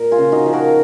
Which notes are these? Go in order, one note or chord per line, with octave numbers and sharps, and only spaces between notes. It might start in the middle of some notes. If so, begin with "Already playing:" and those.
Already playing: A#2 A#4
F4 G#4
C#3
D#4 F#4
F3
F#4 A#4